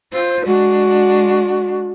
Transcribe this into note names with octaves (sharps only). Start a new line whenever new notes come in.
F4 C5
G#3 D4 F#4